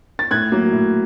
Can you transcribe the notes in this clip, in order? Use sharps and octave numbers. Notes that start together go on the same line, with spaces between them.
A6
A2 F#6 G#6
F#3 A#3
A2